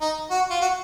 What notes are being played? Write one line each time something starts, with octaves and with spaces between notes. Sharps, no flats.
D#4
F#4
F4
F#4